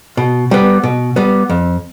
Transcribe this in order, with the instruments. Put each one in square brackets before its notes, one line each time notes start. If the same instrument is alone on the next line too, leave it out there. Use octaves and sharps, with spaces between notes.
[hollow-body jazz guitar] B2
G3 B3
B2
G3 B3
F2